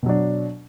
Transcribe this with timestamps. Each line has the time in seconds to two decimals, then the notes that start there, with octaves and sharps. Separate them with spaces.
0.03 B2
0.06 F#3
0.09 D4